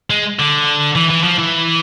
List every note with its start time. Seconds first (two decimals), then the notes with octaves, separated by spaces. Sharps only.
0.10 G#3
0.39 D3
0.96 E3
1.10 E3
1.24 F3
1.38 E3